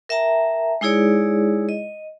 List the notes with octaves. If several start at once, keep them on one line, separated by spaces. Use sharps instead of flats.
A#4 E5 G5 A5 A#5
G#3 D#4 E4 G#4 C#5 D5
D#5